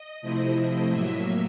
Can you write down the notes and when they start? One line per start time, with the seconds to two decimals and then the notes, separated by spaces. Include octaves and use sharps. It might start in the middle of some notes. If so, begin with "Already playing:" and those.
Already playing: D#5
0.22 C3 F3 A3 C4 E4
0.89 A2 F#3 A#3 E5